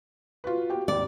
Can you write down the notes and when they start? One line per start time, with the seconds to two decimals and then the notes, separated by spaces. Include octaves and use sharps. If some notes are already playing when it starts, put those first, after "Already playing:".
0.44 F4 F#4 B4
0.69 F#4 G4 G5
0.88 G#1 D#2 D5